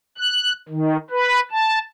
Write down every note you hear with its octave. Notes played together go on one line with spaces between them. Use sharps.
F#6
D#3
B4
A5